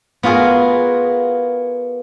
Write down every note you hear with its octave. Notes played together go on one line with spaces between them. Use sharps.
B3 F4 F#4 G#4 A#4